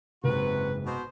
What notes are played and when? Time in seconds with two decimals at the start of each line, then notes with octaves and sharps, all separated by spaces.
0.24 F#1 G#2 C3 F#4 B4
0.86 B2 C5